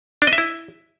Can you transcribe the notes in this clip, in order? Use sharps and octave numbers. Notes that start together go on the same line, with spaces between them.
D4
D#5
E5
E4